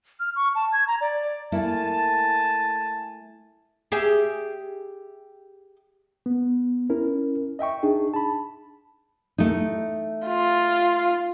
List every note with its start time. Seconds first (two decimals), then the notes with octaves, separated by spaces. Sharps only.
0.20 F6
0.36 C#6
0.55 A5
0.72 G#6
0.87 A#5
1.01 D5
1.52 A3 A#3 E4 G#5 A5
3.92 G4 G#4 E5
6.26 B3
6.90 C#4 E4 A#4
7.59 D#5 E5 G5 C#6
7.83 D4 D#4 G#4
8.14 A5 B5
9.38 A3 D#4
10.27 F4